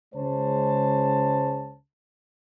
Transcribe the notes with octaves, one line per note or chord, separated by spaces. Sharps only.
C#2 C#3 G#3 C5 C#5 A5